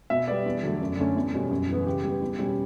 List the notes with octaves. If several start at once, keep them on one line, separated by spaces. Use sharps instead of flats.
B2 E5
G3 B3 D5
E2
D3 F#3 A3
F#2
D3 A3 C#4
E2
B2 G3 C#4
F#2
E3 B3
C#3 G4
G3 B3
E2
B2 G3 C#4